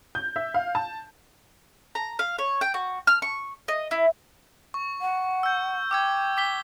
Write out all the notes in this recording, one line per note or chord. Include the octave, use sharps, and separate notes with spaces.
G6
E5
F5
A5
A#5
F5
C#5
G5
F#4
F6
C#6
D#5
E4
C#6
F#5
E6 G6
G5 D6 E6 G#6
D6 B6 G7